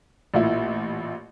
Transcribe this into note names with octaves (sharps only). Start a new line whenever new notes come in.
A1 A#2 E4